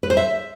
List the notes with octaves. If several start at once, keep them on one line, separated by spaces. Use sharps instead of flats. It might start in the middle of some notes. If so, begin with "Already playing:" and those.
B4
C5
E5